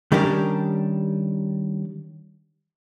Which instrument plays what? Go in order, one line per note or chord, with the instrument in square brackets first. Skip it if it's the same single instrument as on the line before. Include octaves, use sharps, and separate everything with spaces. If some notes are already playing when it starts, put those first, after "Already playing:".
[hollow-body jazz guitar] D#3 G3 C#4 D4 G4 A#4